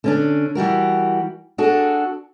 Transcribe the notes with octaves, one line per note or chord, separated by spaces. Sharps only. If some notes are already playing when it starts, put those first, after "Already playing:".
D3 C#4 D4
E3 G3 F#4 A#4
D4 F#4 G#4 A4